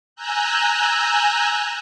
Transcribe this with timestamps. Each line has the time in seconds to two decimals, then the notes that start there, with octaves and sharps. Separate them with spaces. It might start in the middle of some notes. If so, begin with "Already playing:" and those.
0.16 G#5 A#5 E6 F#6 G6